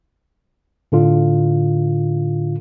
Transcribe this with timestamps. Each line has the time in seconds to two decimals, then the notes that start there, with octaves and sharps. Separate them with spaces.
0.92 A2 D3 F4